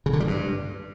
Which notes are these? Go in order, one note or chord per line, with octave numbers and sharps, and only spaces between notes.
C#3
D3
G3
G2